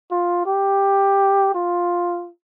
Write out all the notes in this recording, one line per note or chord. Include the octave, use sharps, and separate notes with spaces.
F4
G4
F4